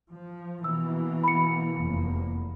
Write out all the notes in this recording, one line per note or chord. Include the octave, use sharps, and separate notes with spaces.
F3
B2 E3 A#3 E6
B5 C#7
F1 E2 A#3